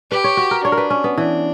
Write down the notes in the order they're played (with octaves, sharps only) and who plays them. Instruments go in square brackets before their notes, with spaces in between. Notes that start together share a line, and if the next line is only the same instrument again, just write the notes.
[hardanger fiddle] G4 [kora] B4
[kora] C#5
F#4
A#4
[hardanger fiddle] D4 [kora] C#5
[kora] A#4
B4
C#4
B3
[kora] E3 [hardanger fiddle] D4